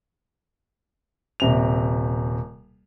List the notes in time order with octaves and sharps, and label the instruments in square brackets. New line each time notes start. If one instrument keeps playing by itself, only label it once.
[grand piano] D#1 C3 F7